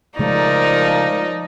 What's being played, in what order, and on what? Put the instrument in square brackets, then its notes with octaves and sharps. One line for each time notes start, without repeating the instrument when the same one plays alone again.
[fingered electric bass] C#3 G#3 A3 [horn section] F3 [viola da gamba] D#4 [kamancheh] A#4 D5